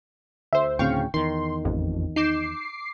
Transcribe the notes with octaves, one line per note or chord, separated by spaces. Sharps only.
D2 C5 E5
D2 A2 C#3 C4 F5 G5 C#6
E2 D#3 C6
A1 F2
D#4 D6 G6 C7 E7